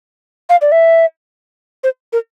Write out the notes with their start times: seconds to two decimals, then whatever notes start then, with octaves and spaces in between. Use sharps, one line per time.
0.49 F5
0.62 D5
0.72 E5
1.84 C5
2.13 A#4